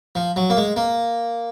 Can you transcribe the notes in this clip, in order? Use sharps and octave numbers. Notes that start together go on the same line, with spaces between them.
F3
F#3
A#3
G#3
A#3